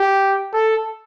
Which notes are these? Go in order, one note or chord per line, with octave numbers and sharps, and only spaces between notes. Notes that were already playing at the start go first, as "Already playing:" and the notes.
Already playing: G4
A4